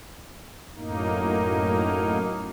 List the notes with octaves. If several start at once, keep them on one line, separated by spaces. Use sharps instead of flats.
F#2 A2 A#3 D#4